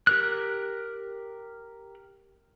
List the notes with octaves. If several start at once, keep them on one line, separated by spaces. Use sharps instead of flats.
G4 A#4 F#6